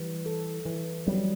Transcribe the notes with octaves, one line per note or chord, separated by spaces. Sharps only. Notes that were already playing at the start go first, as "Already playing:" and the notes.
Already playing: E3 G3
A4
E3
F#3 G3